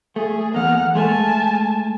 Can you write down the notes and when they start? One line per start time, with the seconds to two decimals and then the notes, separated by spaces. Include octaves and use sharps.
0.16 A3 G#4
0.54 E2 A#3 F#5 F6
0.95 G#3 A3 G#5 A5